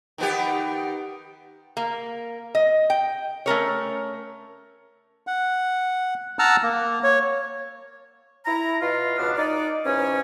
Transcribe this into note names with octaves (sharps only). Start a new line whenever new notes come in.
D#3 B3 G4
A#3
D#5
G5
A3 C#4 A#4 C#5
F#5
F#5 A5 A#5 E6 F6
A#3
C#5
E4 A#5
B2 F4
C#2 B2 F3 B3 D4 F6
D#4 D5
G#2 B2 E3 C#4